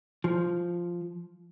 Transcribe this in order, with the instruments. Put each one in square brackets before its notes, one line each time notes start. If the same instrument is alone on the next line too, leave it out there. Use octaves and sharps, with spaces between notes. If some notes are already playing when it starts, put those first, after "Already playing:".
[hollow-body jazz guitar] F3